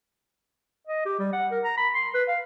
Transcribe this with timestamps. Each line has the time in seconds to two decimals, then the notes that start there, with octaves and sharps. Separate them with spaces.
0.87 D#5
1.06 G4
1.19 G3
1.33 F#5
1.52 A#4
1.64 A#5
1.78 B5
1.95 C6
2.14 B4
2.29 F5